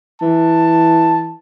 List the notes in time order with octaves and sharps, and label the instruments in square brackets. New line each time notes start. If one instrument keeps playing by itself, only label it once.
[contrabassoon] E3 [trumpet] A5